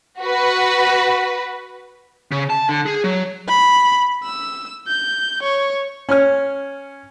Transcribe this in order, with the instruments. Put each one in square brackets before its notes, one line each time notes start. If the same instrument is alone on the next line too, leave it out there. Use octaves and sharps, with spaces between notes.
[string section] F#4 B4
[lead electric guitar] C#3
A5
D3
G#4
F#3
[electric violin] B5
E6
G6
C#5
[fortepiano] C#4 C#5 F6